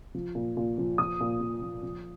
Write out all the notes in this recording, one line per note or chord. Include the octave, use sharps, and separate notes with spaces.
F3
A#2
A#2
F3
F3 D#6
A#2
A#2
F3
F3